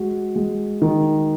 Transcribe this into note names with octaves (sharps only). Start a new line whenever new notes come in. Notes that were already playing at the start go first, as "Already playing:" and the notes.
Already playing: G#3 F#4
G#3
D#3